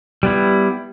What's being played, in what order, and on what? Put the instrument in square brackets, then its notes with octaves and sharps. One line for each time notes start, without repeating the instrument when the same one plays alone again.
[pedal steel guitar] G3 B3 E4